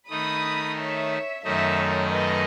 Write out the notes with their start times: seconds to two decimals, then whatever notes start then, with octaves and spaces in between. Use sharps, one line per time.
0.10 D#3 A3 D#4 B5 D#6
0.78 C#5 E5
1.44 F#2 D#3 A3 D#4 C#5 E5
1.78 C#5
2.12 B4 D#5